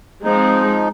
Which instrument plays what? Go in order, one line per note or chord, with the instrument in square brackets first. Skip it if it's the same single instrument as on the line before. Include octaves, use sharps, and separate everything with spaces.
[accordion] F3 D#4 [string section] G#3 C4